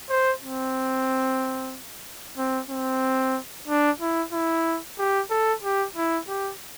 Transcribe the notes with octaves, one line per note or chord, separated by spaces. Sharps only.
C5
C4
C4
C4
D4
E4
E4
G4
A4
G4
E4
G4